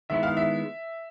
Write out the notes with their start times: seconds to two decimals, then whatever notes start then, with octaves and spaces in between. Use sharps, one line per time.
0.10 D#3 G#3 B3 E4 E5
0.23 F5
0.37 E5